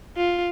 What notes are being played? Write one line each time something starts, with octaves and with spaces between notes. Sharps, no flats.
F4